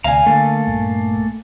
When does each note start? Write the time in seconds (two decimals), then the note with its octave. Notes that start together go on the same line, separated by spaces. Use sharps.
0.04 D2 C3 F5 G#5 A#5
0.26 D3 A3 A#3 A4
0.67 A#1 G2